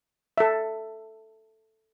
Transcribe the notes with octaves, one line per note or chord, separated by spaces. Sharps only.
A4 E5